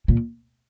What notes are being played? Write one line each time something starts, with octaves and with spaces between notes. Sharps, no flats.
A#2